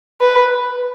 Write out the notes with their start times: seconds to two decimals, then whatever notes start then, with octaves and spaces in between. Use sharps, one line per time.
0.21 B4